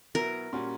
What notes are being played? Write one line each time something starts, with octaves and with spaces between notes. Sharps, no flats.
B2 F#3 B3 E4 A#4
A#2 G3 C#4 F#4